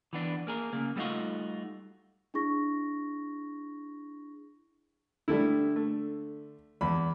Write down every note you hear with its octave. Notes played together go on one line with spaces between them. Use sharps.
E3 B3 D4
A#3 G#4 A#4
C#3 A#3
G3 A3 B3 D#4 F4 F#4
D4 E4 G#4 C#6 A#6
D3 G3 A3 E4
A3
E2 B5